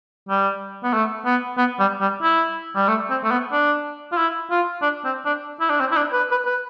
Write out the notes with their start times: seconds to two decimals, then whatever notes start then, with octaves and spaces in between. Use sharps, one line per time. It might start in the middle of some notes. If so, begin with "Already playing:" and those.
0.29 G3
0.84 B3
0.93 A3
1.25 B3
1.58 B3
1.79 G3
2.01 G3
2.23 E4
2.76 G3
2.88 A3
3.10 C4
3.24 A3
3.31 B3
3.52 D4
4.12 F4
4.17 E4
4.51 F4
4.82 D4
5.05 C4
5.26 D4
5.61 E4
5.70 D4
5.80 C4
5.91 E4
5.97 D4
6.12 B4
6.31 B4
6.46 B4